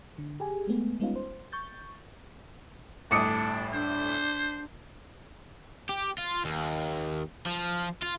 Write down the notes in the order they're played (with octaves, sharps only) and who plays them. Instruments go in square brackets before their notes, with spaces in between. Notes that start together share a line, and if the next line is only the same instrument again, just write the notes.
[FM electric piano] D3
G4 G#4 G#5
G#3 A3 B3
G3 G#3 B3 C#4 D#4 F4
C5
C#6 G6 A6
[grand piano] G1 D2 A2 [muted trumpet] D4 [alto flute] A5 [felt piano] D6 D#6 C#7
[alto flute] D4 [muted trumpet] C5
[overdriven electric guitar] G4
F4
D#2
F3
F4